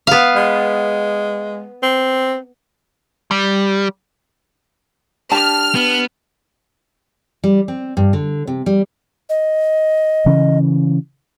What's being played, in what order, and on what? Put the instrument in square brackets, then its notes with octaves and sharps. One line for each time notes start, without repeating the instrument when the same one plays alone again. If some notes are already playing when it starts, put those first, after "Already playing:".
[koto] B3 F5
[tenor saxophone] G#3
C4
[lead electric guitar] G3
[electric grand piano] D4 G4 [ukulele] A5 [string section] F6
[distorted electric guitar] B3
[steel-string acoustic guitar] G3
C4
G2
D3
C3
G3
[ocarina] D#5
[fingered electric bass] C#3 E3 C#4